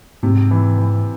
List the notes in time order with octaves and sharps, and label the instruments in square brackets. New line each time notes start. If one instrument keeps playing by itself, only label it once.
[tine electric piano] G#2 [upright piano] C3
[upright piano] E3
E3